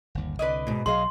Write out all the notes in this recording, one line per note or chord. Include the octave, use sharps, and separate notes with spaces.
G1 D#2
C2 D3 B4 D5 D#5
G#2 B2
B1 F#3 G#4 D#5 F5 C6